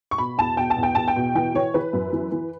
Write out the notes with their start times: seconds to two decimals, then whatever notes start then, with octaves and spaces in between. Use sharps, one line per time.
0.11 C#6
0.18 B2 B5
0.38 E2 A5
0.57 B2 G5
0.70 A5
0.77 E2
0.83 G5
0.95 E2 A5
1.08 G5
1.16 B2
1.35 E3 G5
1.55 E3 C#5
1.74 E3 B4
1.93 F#2
2.13 E3
2.32 E3